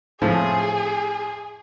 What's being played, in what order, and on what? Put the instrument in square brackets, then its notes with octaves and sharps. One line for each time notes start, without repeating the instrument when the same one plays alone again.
[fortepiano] A2 F3 C4 [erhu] G#4